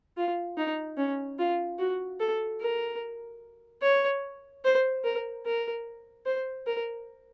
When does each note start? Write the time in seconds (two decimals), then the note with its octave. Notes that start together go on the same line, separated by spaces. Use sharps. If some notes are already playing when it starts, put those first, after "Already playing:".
0.17 F4
0.57 D#4
0.97 C#4
1.39 F4
1.79 F#4
2.20 A4
2.61 A#4
3.82 C#5
4.64 C5
5.04 A#4
5.45 A#4
6.25 C5
6.67 A#4